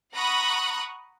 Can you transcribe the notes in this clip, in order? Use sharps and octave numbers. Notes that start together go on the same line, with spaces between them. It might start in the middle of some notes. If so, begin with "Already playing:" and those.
F#5 A#5 B5 C#6 D#6 F#6